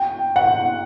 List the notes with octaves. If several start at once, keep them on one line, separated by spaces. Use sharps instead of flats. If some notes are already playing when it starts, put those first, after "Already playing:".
Already playing: G5
F#5